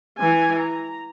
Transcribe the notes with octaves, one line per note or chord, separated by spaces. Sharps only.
E3 G#5
A#5